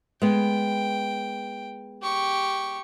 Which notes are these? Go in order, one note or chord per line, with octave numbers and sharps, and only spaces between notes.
G#3 B3 G5
G4 C#6